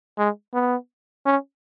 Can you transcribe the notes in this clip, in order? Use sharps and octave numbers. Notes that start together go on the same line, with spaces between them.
G#3
B3
C#4